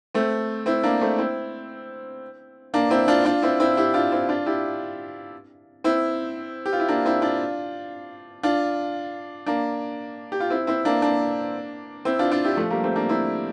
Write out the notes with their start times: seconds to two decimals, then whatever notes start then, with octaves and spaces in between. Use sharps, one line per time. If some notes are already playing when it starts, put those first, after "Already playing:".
0.14 A3 C4
0.66 C4 E4
0.83 A#3 D4
1.01 A3 C4
1.18 C4 E4
2.74 A#3 D4
2.90 C4 E4
3.08 D4 F4
3.25 D4 F4
3.42 C4 E4
3.60 C4 E4
3.77 E4 G4
3.94 D4 F4
4.12 C4 E4
4.29 D4 F4
4.46 E4 G4
5.84 C4 E4
6.66 G4
6.73 F4
6.80 E4
6.88 A#3 D4
7.05 C4 E4
7.22 D4 F4
8.43 D4 F4
9.46 A#3 D4
10.32 G4
10.40 F4
10.50 C4 E4
10.67 C4 E4
10.85 A#3 D4
11.02 A#3 D4
12.05 C4 E4
12.19 D4 F4
12.31 D4 F4
12.45 E4 G4
12.57 F3 A3
12.70 G3 A#3
12.84 A3 C4
12.96 A#3 D4
13.09 C4 E4